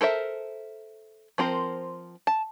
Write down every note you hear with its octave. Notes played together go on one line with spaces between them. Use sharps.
A4 A#4 C5 E5
F3 C4 A#4 C5
A5